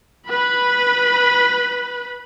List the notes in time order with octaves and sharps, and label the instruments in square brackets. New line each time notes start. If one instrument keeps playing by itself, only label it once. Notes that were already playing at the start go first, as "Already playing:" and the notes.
[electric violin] B4 B5